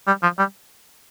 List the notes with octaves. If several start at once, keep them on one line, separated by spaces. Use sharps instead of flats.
G3
F3
G3